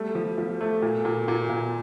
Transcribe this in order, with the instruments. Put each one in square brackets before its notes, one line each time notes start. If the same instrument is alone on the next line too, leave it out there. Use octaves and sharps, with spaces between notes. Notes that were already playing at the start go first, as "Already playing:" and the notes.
Already playing: [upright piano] G3 A3
F3
F3
A3
A#2
A#2
A#2
A#2